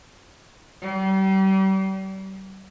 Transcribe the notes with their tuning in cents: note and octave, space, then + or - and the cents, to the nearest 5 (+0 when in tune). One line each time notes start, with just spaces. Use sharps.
G3 -35